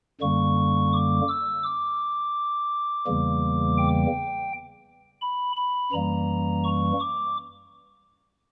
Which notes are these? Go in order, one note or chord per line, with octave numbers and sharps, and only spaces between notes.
F#2 D3 G3 A#3 C#6
D6
E6
D6
E2 C#3 E3 G3 A#3
G5
B5
B5
F#2 E3 G3 A#3 A#5
C#6
D6